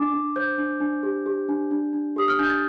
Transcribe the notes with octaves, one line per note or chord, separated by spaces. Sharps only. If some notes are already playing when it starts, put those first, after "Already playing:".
Already playing: D4 D6
D4
C5 G6
D4
D4
G4
G4
D4
D4
D4
G4 D#6
F6
D4 G6
A6